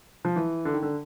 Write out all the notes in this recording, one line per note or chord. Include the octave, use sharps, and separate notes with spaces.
F3
E3
D3
D#3
D3